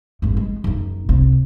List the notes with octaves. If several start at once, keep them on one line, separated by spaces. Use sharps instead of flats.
G#1 G2
G#3
F#1 D#4
C2